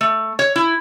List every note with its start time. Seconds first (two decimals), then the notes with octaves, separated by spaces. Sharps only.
0.01 A3
0.39 C#5
0.56 E4